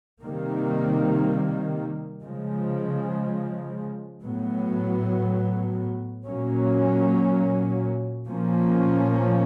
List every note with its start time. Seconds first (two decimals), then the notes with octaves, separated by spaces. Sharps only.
0.21 C3 D#3 G3 A#3
2.22 C#3 F3 G#3
4.24 A2 F#3 B3
6.26 A#2 F#3 A#3 C#4
8.27 A#2 F3 A#3 C#4